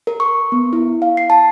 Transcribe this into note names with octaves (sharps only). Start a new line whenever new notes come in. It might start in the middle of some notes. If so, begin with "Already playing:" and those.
A#4
C#6
B3
E4
F5
C7
A5